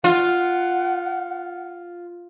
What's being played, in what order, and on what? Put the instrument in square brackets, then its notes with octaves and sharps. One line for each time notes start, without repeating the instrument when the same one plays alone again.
[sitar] F4 [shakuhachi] F#5